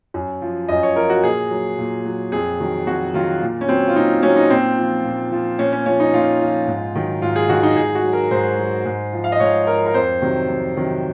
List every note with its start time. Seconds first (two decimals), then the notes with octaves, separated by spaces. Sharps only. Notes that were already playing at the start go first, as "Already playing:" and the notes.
0.14 F#2
0.42 F3
0.68 F#2 D#5
0.83 C#5
0.96 F3 A#4
1.10 F#4
1.23 A#2 G#4
1.51 F#3
1.78 A#2
2.05 F#3
2.32 F2 G#4
2.60 D#3 F#3
2.87 F2 F#4
3.14 D#3 F#3 F4
3.42 A#2
3.61 C#4
3.68 F#3 C4
3.88 F4
3.95 A#2 D#4
4.22 F#3 C#4
4.36 D#4
4.50 A#2 C4
4.77 F3
5.04 A#2
5.32 F3
5.59 A#2 C#4
5.72 C#4
5.86 F3 C#4
6.00 D#4
6.13 A#2 F4
6.41 F3
6.67 G#2
6.95 D#3 F#3
7.22 G#2 F4
7.36 G#4
7.49 D#3 F#3 F#4
7.63 D#4
7.76 G#2 G#4
7.95 F#4
8.04 F#3
8.13 A#4
8.31 G#2 C5
8.58 F#3
8.86 G#2
9.13 F3
9.24 F5
9.32 D#5
9.40 G#2 C#5
9.67 F3 A#4
9.86 A#4
9.94 F2 C5
10.22 C3 D#3 F#3
10.49 F2
10.76 C3 D#3 F#3